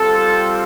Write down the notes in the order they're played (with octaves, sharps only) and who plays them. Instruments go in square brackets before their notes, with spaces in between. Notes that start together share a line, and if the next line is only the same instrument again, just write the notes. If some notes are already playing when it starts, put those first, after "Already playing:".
Already playing: [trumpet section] G3 C4 F4 A4